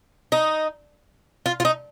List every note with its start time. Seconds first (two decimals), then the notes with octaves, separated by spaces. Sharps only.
0.32 D#4
1.46 F4
1.60 F4
1.65 D#4